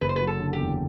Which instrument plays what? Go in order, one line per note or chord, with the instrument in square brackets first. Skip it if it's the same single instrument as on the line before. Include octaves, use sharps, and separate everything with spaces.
[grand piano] F#1 [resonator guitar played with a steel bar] B4
[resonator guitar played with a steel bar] C5
B4
[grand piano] F#3
[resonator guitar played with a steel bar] A4
[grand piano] D3
[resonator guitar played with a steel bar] G4
[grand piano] E2